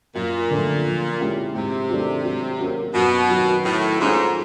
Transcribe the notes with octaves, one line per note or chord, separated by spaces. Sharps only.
F#2 A#2
D3 F3 A3
F3
G#3 C#4 E4 G4
G#2 C3
D#3 F#3 A3 D4
F#3
A#3 C#4 F#4
F#2 B2
D#3 F#3
A2 D#3
G#2 F#3 A3 C#4 F4